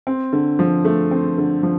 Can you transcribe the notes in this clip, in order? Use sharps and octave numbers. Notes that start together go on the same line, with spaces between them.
C4
D3
F3
A3
C4
D3
F3